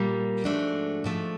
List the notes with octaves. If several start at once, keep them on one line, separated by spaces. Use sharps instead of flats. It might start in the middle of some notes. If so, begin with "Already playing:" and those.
Already playing: A#2 G3 A#3
G#2 F3 A3 D4 F#4
G#2 F3 A3